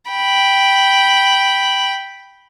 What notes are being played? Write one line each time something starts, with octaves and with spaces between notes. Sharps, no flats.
G5 B5